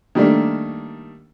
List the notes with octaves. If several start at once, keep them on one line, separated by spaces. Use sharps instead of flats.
D#3 G3 A3 A#3 D4